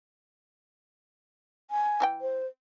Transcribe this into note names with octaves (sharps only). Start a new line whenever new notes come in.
G#5
E3 D#4 G5
C5